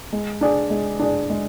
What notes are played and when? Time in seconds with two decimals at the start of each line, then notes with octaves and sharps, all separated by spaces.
0.13 G#3
0.41 D4 G#4 D5
0.70 G#3
0.99 D4 G#4 D5
1.30 G#3